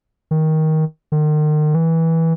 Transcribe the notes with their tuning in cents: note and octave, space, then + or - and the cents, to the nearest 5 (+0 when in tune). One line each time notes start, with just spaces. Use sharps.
D#3 +15
D#3 -40
E3 -15